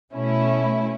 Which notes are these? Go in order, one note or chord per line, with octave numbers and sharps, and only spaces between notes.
B2 A3 C#4 E4